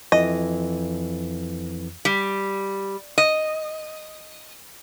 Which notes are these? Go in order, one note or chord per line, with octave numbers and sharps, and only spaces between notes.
F2 E3 D#5
G3
D#5